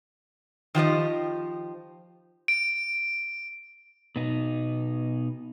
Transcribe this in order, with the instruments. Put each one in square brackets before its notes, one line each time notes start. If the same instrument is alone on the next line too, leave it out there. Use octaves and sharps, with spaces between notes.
[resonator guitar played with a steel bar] D#3 F3 G4 D#5
[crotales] D7
[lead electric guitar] B2 D#4